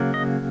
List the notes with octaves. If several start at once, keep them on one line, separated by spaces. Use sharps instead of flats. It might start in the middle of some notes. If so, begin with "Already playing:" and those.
Already playing: C#3 F#3 A#3
D#5